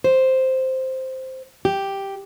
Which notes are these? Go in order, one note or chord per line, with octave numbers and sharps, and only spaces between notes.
C5
G4